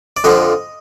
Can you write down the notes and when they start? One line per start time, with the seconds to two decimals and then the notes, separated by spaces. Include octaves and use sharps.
0.17 D5
0.24 F2 D3 F3 D#5